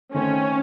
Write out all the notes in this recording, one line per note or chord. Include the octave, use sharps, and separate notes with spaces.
D#3 A3 C4 C#4